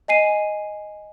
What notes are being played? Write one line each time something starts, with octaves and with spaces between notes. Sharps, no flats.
D#5 G#5 C7 D#7